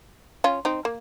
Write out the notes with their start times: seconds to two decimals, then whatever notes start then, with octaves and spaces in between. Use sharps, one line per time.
0.44 C#4 F4
0.65 C4 D#4
0.85 A#3